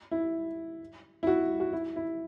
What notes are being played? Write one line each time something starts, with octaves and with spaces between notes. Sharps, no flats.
E4
E4
F#4
F#4
E4
E4